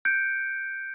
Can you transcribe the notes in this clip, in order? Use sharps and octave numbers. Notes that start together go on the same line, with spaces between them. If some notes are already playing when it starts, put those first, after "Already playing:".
F#6 G6 C#7 D7